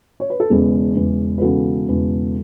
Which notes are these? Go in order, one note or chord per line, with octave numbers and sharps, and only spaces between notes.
C#5
B4
A4
E1 E2 C#3 G#4
E1 E2 C#3
B4
E1 E2 C#3 F#4 A4
E1 E2 C#3